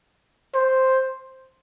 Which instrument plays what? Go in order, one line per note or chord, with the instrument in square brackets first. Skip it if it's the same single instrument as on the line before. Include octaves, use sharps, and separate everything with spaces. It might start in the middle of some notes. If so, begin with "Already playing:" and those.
[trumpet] C5